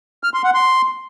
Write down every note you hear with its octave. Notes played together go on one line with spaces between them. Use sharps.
F6
C6
F#5
C6